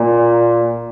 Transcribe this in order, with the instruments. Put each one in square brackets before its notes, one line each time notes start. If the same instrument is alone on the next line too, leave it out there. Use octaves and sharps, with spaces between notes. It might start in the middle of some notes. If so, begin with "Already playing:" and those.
Already playing: [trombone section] A#2